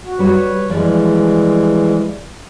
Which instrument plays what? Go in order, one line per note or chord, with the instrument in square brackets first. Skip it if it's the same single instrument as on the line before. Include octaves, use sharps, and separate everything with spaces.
[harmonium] F#4
[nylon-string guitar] G3 F#4 [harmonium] B4 C#5
[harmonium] E3 G3 G#3 [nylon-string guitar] F3 D5